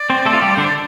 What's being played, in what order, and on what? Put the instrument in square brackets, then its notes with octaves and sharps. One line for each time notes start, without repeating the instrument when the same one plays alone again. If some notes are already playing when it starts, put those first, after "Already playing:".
Already playing: [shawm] D5
[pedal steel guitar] C4 C5
A3 A4
F4
G3 G4
[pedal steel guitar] D3 D4 [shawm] C5
[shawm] D5